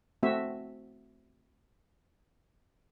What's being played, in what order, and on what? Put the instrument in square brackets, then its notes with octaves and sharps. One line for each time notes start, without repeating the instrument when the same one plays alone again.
[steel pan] A3 C4 F#4 E5